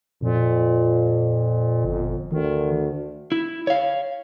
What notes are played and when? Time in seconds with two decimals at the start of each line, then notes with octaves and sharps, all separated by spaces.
0.22 F2 A#2
1.85 G1
2.32 D2 D#3
3.32 E4
3.67 C#5 F5